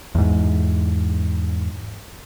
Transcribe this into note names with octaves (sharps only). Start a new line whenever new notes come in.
E2 G#2